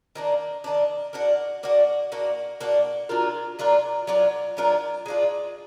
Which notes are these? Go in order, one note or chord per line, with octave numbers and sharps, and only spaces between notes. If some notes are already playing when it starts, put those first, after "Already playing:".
D#3 A#3 D4
D#3 A#3 D4
A#3 D4 F#4
A#3 D4 F#4
A#3 D4 F#4
A#3 D4 F#4
F#3 D4 F4 A#4
F#3 D4 F4 A#4
F#3 D4 F4 A#4
F#3 D4 F4 A#4
G#3 D4 F4